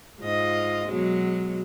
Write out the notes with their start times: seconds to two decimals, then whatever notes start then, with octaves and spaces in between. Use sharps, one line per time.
0.20 G#2 F4 D#5
0.90 B2 F#3 G#3